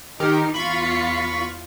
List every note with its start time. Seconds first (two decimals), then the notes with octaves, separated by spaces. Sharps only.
0.20 D#3 D#4 G4 A#4
0.54 E2 F4 B5 C#6